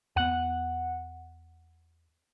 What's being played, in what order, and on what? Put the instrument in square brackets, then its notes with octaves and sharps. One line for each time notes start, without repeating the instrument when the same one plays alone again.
[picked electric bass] E2 B3 [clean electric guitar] F#5